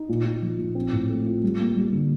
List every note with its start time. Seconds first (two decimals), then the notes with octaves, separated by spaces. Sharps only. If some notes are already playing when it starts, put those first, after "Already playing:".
Already playing: D#4
0.09 A#2
0.26 A#2
0.42 F3
0.58 A#2
0.75 C4
0.93 A2
1.09 A3
1.26 F4
1.43 G3
1.60 A#3
1.76 G3
1.93 D3